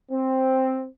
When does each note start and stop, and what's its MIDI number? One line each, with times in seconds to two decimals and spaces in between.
0.12 0.86 60